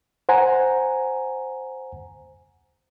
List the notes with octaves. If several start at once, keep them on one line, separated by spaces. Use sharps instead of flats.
C5 F#5 G#5 A#5